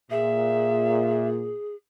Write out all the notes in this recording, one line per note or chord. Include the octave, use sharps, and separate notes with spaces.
A#2 G#4 E5